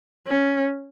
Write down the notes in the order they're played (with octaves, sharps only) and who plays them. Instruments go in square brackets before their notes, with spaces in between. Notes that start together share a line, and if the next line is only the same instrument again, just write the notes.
[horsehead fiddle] C#4